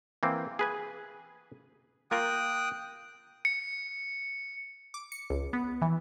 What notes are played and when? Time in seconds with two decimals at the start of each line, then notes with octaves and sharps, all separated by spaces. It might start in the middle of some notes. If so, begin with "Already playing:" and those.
0.23 E3 A#3 C4
0.59 G#4 B4 G#5
2.11 A#3 F4 A#4 G5 D#6 F#6
3.45 C#7
4.94 D6
5.12 C#7
5.30 C#2
5.53 B3
5.82 E3